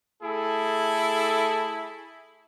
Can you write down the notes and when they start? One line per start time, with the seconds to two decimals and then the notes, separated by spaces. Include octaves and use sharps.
0.22 A3 E4 G#4 A4